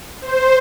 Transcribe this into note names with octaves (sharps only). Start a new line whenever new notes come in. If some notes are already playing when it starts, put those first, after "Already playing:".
C5